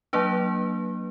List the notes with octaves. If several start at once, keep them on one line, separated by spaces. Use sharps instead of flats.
F#3 A#3 D4 B4